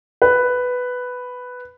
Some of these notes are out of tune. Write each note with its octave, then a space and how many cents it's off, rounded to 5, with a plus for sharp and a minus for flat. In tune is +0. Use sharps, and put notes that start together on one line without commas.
B4 +5